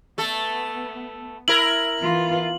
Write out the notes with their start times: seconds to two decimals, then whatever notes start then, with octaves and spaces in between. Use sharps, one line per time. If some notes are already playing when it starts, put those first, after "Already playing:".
0.18 A3 B3 A4
1.48 E4 A#4 F#7
2.01 E3 B3 F4